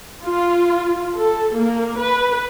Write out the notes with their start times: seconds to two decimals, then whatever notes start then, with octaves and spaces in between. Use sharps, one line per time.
0.24 F4
1.16 A4
1.55 A#3
1.99 B4